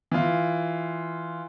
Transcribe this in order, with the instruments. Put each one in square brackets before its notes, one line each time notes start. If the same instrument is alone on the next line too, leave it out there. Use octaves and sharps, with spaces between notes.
[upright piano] E3 F4